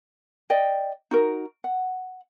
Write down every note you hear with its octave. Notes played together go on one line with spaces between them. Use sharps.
D5 D#5 G5
D#4 F#4 A#4
F#5